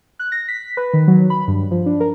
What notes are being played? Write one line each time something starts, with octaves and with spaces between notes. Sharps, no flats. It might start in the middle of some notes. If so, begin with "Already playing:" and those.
F#6
A#6
B6
B4
D#3
F#3
B5
G2
F3
D4
A#4